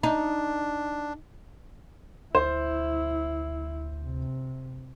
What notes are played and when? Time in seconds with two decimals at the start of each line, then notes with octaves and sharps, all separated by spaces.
0.03 D4 D#4
2.35 D2 E4 C5
4.03 C3